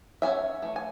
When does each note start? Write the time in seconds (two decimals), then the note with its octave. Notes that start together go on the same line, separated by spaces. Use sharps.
0.22 F#3 C#4 E5 G#5
0.62 E3 A3
0.76 G#5